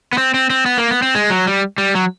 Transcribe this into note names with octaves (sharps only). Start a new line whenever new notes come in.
B3
C4
C4
C4
B3
A#3
B3
C4
G#3
F#3
G3
G3
F#3